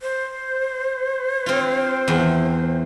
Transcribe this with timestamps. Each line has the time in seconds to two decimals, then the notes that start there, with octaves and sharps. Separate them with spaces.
0.02 C5
1.46 C4 F4
2.08 E2